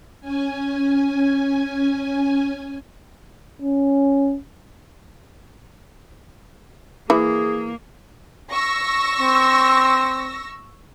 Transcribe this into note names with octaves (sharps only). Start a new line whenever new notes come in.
C#4 G#5
C#4
E3 A#3 E4 G#4
C#6 E6 A#6
C4